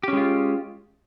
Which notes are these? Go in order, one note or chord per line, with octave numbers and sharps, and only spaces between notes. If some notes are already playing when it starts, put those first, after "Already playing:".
G#3 C#4 F4 G4